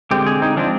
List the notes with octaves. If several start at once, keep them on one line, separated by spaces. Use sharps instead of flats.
D3 G#3 C4 G4
G#4
D#4
F3 G#3 C4 D4